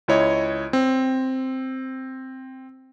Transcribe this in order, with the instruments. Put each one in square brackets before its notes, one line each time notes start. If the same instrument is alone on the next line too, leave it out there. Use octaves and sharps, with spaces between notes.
[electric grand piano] C#2 E4 C#5 D#5
C4